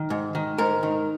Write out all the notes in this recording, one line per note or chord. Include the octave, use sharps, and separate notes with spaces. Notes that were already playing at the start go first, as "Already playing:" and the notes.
Already playing: D#3
G#2
D#3
G#2 A#4
D#3